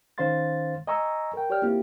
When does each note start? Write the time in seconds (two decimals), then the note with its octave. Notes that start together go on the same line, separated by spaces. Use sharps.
0.18 D#3 C#4 C5 F5 C6 A6
0.87 D#5 G#5 A#5 C#6 E6
1.34 A#4 G5
1.50 G4 C#5 D5 G5 F6
1.62 A#3 C4 E4 F4 G4